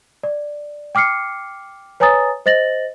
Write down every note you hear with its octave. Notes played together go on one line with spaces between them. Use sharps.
D5
G5 D6 F6 C7 C#7
B4 C#5 G#5 A#5 D#6 A6
C5 D#5 A6 A#6 F#7